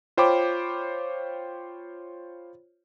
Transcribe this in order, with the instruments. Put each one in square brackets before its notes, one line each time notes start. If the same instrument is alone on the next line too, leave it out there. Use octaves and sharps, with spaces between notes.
[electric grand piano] F4 C5 C#5 G5 B5 D6